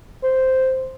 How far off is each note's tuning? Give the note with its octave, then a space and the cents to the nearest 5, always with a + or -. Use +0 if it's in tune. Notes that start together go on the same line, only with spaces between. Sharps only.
C5 -5